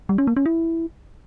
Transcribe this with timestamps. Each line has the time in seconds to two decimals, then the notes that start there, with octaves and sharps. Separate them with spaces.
0.09 G3
0.18 C#4
0.27 A#3
0.37 C#4
0.46 E4